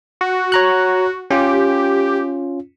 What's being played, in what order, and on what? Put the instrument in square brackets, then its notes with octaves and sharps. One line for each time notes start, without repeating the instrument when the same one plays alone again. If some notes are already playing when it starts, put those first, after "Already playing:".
[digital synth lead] F#4
[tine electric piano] C#5 A#5 F#6
[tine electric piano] C#4 F4 [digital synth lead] G4